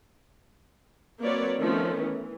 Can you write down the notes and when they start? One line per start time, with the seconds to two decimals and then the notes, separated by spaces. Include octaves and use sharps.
1.21 F#3 A#3 C4 B4 C#5 D5
1.59 D#3 F3 A3 B3 C#4
1.99 E3